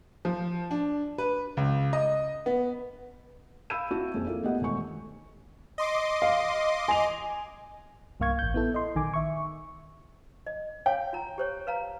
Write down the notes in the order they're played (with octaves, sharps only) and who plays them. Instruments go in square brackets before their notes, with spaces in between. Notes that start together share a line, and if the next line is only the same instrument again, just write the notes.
[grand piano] F3
D4
B4
C#2
D#5
B3
[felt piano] F5 B5 E6 G6 G#6 D#7
C4 E4 F#4 A5
A#1 F2 C4 G#4
A#3 E4 F4 A4
A3 B3 G4 D#5 F#5
E1 D#3 A3 G#5 C#6
[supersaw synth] D#5 C6 D6
[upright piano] F5
G#5 F7
[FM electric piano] C2 G2 A#3 F5 C#6 G#6
A1 G6
B3 E4 A4
D#5 C6
A#1 D#3 G#5 D6
E5 C#6
[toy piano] D#5
[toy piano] C#5 F5 G#5 [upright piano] G5
[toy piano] F4 A#5
G4 C5 C#5
B4 F5 A#5